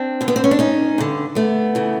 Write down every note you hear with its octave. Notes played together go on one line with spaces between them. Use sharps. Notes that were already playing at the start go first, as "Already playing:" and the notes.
Already playing: C4 D4
G2 D3
B3
C4
C#4
D4
C#4 D#4
G2 D3
A3 B3
C#3 E3